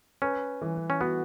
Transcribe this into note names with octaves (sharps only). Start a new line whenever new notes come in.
C#4 B4
E3
C#4
B3 F#4